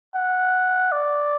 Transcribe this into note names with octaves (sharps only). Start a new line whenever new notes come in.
F#5
D5